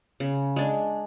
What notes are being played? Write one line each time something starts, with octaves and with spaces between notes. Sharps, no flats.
C#3
G#3 D4